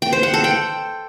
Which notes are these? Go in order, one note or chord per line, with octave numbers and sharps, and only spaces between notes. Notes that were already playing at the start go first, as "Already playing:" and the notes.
G5
C5
F#5
A4
G5